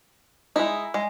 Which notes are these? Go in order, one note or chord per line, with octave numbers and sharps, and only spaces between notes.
G#3 D#4 E4
G#3